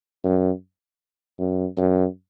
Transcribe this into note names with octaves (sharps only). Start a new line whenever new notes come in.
F#2
F#2
F#2